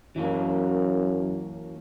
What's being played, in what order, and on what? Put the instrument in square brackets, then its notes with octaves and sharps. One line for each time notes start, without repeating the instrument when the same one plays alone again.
[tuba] F#2 [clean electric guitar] E3 F#3 A#3